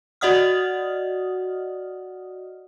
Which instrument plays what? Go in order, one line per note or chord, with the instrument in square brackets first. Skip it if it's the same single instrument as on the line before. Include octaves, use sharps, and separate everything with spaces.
[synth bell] F#4 D5 D#5 F#5 D#6 F6